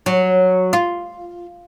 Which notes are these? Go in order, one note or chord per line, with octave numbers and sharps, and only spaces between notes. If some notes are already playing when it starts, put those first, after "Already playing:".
F#3
F4